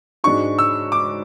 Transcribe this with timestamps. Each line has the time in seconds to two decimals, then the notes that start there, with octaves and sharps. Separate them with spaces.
0.24 G#2 G#3 D4 F#4 C#6
0.59 E6
0.92 D6